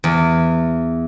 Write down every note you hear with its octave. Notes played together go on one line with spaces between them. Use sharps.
E2